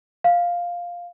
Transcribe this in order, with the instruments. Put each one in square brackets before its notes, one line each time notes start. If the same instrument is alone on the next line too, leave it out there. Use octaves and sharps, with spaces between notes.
[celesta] F5